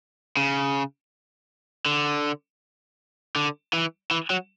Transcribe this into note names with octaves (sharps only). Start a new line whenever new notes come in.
C#3
D3
D3
E3
E3
F#3